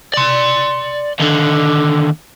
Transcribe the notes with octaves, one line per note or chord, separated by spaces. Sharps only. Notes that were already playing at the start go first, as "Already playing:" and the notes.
D5 C6
D#2 D3